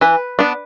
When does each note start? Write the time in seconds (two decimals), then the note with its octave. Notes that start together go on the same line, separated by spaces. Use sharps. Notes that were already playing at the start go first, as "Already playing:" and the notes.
0.01 E3 B4
0.39 B3 D4